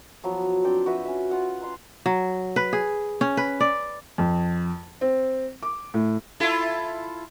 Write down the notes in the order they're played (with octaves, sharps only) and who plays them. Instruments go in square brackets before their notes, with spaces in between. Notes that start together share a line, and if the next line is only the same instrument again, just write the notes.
[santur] F3 F#3 B3
C4 D4 G5
F#4 B4 E5
C#4 E5
F4 F#5
A#5 C6
[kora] F#3
B4
G#4
C#4
B4
D5
[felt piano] F2
C4
D6
A2
[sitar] E4 F4 A4